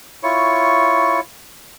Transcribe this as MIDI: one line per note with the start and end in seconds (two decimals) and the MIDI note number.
0.23 1.20 64
0.23 1.20 65
0.23 1.20 73
0.23 1.20 85